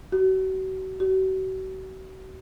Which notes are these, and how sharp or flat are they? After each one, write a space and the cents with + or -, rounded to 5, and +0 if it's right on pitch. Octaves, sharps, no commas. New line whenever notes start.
F#4 +35
F#4 +40